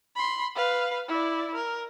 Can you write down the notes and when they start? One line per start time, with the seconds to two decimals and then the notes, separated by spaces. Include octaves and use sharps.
0.16 B5 C6
0.56 B4 F5
1.08 E4 D5
1.55 A#4